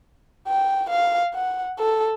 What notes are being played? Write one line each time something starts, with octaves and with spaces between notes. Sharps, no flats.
G5
F5
F#5
A4